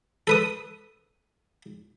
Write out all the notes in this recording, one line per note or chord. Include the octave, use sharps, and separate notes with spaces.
A4 B4 D#6